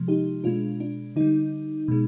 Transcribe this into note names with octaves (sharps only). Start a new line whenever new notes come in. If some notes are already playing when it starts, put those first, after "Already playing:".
Already playing: C3 F3 G#3
D#4 G4
B2 G#3 D4 F4
D4
D3 G3 D#4
B2 G#3